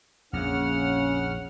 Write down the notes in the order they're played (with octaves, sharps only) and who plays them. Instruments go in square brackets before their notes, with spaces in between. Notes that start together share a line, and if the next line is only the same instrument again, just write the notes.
[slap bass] A#1 F2 A#2 [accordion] C#3 F#5 F6 [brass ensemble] C#4